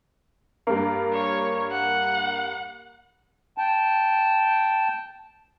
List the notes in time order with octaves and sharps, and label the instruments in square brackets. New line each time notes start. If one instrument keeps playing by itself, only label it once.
[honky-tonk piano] G2 A#3
[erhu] C#5
F#5
[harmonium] G5 A5